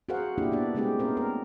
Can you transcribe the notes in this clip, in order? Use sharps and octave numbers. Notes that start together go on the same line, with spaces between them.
F#4 G#4 A#4 C5 F5 F#5
A#3 D4 E4 G4
B3 D4 D5
G#3 A3 C4 D4 G4 G#4
B3 C#4 A#4 C5
A#4